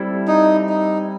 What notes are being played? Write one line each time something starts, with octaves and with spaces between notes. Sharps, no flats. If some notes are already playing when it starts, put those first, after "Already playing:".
Already playing: G3 C4 E4 A4
D#4
D#4